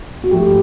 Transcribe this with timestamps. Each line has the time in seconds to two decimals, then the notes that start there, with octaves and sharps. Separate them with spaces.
0.24 F#4
0.31 G#2 F3 A3 G4